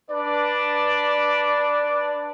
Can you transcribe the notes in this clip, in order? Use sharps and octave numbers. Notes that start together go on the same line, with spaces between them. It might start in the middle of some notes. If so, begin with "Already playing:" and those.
D4 B4 D5